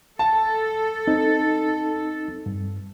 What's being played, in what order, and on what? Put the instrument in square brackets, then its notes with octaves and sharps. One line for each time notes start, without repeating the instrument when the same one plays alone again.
[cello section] A4 [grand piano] A5
[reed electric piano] C4 D#4
G2